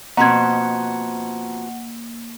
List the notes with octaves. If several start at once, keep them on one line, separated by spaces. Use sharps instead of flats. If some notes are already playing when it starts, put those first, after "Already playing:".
B2 F3 A#3 C4 F#5 A#5 G#6